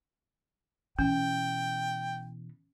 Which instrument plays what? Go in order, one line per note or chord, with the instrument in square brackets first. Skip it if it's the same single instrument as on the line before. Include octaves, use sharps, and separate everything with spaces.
[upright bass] B2 E3 [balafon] C#4 [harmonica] G5